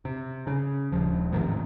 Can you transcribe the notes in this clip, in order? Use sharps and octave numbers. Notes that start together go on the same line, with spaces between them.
C3
C#3
D#1 F3
A1 G#2 C3 D#3